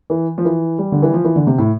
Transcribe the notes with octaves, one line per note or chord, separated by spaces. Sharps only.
E3
F3
E3
G3
D3
E3
F3
E3
D3
C3
A2